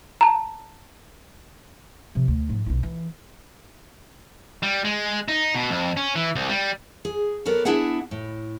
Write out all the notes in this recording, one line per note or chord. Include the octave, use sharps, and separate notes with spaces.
A5 A#5
C3 F3
D2
G#2 F3
B1 E4
E3
G3
G#3
D#4
B2
F2
C#4
E3
C2
G3
G#4
F#3 B3 A4 A#4 D5
B3 D4 E4 G#4 E5 F#5
A2